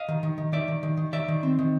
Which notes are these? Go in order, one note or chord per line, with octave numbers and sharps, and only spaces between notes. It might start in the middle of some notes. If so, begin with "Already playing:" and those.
Already playing: D#5 F5
D#3
D#3
D#3
D#3 D5 E5
D#3
D#3
D#3
D#3 D5 E5
D#3
C4
D#3